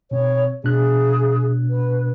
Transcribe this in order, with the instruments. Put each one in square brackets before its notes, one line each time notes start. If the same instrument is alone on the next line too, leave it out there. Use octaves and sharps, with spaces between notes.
[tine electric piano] B2 C4 [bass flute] C#5
[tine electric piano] B2 D4 F#6 [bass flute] G#4
[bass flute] B4